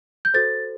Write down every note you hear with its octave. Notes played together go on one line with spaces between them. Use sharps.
G6
F#4 A4 C5 A6